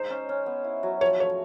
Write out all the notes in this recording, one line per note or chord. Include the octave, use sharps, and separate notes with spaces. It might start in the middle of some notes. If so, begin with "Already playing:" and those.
Already playing: G#3 D#4 C5
C#4
C#4
B3
E4
F#3
F3 C#5
A3 C#5